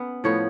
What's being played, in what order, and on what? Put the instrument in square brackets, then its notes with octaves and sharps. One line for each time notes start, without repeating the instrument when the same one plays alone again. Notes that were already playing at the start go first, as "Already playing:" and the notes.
Already playing: [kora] B3 C#4
A2 F3 B3 C#5